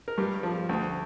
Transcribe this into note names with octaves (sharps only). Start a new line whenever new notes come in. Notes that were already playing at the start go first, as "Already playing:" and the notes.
A#4
G2 G4
F3
D2